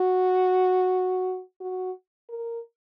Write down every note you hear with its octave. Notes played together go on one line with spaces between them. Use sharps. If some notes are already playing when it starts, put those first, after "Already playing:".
Already playing: F#4
F#4
A#4